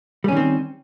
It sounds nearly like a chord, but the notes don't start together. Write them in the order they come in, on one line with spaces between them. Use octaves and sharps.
G3 C#4 D#3 C4